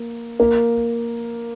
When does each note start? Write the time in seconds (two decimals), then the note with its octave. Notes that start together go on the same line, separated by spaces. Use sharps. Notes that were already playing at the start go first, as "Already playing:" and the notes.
Already playing: A#3
0.40 A#3